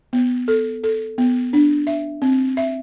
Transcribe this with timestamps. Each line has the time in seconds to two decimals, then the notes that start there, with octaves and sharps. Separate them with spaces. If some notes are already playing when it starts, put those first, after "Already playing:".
0.13 B3
0.48 A4
0.84 A4
1.18 B3
1.53 D4
1.87 E5
2.22 C4
2.57 E5